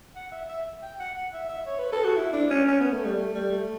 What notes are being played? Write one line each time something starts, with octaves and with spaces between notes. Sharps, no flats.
F#5
E5
E5
G5
F#5
F#5
E5
E5
C#5
B4
A4
F#4
E4
D4
C#4
C#4
B3
A3
G3
A3
G3
A3